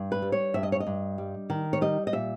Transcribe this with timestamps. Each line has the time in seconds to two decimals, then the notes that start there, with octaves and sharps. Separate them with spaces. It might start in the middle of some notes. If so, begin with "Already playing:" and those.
Already playing: G2
0.12 B4
0.22 G3
0.32 C#5
0.54 G2 E5
0.63 D#5
0.72 C#5
0.80 D#5
0.87 G2
1.18 G3
1.50 D#3
1.73 C#5
1.81 G3 D#5
2.07 D#5
2.13 A#2 E5